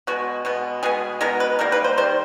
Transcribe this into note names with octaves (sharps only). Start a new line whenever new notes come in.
B2 G#3 B3 F#4
B2 G#3 B3
B2 G#3 B3 G#4
B2 G#3 B3 A#4
B4
D#3 G3 A#3 A#4
B4
C5
D#3 G3 C5